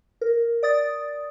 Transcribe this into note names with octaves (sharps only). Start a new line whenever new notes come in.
A#4
D5 D#6 A6